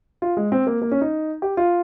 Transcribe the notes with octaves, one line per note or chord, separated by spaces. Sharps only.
F4
G#3
C4
A#3
A#3
C#4
D#4
G4
F4